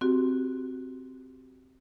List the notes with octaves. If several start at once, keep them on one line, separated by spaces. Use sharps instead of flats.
C4 F#4 G4